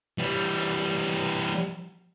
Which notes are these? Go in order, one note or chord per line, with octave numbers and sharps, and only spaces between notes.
E3 G3